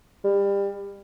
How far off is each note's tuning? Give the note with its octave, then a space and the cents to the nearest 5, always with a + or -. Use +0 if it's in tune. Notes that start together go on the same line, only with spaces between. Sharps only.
G3 +25